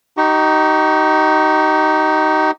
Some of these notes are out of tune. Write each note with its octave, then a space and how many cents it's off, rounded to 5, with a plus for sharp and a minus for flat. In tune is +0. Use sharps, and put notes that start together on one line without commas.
D#4 +0 G4 -40 C#6 -15